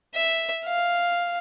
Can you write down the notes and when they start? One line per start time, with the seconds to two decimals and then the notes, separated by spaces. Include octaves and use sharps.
0.15 E5
0.65 F5